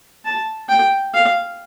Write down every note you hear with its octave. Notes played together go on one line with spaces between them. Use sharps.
A5
G5
F5